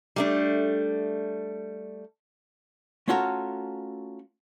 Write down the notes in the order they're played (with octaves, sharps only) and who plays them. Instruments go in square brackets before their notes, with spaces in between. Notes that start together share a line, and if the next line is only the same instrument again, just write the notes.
[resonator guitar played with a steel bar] G3 A3 D4
[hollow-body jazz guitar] A3 C#4 F4 F#4 A4 A#4